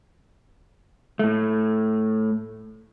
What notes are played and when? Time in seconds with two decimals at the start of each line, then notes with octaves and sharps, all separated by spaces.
1.19 A2 A3